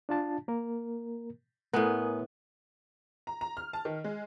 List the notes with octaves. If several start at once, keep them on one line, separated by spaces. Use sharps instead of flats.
D4 F4 A5
A#3 A#4
A2 B3 A#4 G#5 D#6
A#5
A#5
F6
A5
D#3
G#3